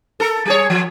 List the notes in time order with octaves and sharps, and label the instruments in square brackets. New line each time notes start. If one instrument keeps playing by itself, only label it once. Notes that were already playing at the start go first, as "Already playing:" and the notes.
[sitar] A4 A#4
G3 G#4 C#5
F3